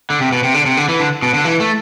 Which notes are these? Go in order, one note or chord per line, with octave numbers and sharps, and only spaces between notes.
D3
C3
B2
C3
D3
C3
D3
E3
D3
B2
D3
E3
A3